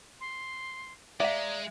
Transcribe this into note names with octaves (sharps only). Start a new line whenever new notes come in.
C6
G#3 D5 E5 F5 A#5